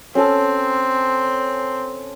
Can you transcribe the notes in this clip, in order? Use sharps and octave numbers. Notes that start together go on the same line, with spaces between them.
C4 C#4 A4 A5